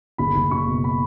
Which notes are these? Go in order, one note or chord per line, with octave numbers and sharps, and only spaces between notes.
F#1 B5
F#1
F#1 C#6
B2
B5